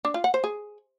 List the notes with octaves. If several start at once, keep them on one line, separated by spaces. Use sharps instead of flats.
D4
F4
F#5
C5
G#4